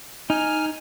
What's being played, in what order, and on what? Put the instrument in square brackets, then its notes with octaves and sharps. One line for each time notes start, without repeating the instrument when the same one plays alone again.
[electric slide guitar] D#4 [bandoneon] G#5 F6